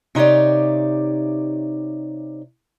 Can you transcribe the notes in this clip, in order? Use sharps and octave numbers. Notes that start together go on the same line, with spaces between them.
C3 D#4 G4 C#5 D5